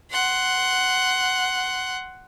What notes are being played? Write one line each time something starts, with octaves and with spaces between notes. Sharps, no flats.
F#5 C6